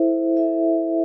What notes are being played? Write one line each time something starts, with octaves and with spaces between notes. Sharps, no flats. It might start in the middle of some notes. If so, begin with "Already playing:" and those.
Already playing: E4 A4 C5 E5
E4 A4 C5 E5